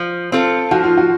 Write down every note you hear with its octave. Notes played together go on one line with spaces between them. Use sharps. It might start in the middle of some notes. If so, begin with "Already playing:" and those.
Already playing: F3
C4 F4 A4
F3 F#4
F4
F#4